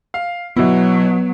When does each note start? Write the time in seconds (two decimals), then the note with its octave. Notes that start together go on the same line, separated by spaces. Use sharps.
0.14 F5
0.57 B2 F#3 B3 E4